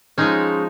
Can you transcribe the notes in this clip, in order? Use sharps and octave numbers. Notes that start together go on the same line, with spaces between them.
F3 G#3 C#4 D#4